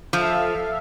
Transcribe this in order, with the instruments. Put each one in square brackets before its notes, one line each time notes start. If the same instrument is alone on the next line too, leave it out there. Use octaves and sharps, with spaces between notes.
[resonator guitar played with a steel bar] F3 [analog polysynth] A4 E5 F5